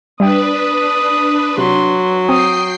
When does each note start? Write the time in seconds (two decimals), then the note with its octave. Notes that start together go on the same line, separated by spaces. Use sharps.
0.20 G3 D4 B4 E5 G5 D#6
1.58 C3 F#3 C6
2.29 C4 G5 D#6 C7